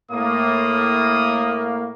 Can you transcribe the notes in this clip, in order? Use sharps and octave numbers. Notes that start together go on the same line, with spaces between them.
A2 A#3 D#6